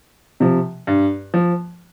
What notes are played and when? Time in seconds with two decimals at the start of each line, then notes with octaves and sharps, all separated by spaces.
0.40 C3 F3
0.87 G2
1.34 F3